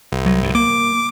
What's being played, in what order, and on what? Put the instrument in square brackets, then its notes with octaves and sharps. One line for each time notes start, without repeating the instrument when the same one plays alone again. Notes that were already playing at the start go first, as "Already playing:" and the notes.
[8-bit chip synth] C2
[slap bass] F#3
G2
[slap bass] A#3 [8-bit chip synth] D6